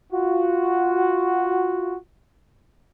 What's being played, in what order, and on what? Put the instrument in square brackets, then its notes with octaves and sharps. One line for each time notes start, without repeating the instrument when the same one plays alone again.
[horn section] F4 F#4